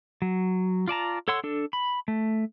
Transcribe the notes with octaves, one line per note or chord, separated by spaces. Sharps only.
F#3
F4 D5 A5 A#5
A4 C#5 F#5 C6 E6
D4 A4
B5
A3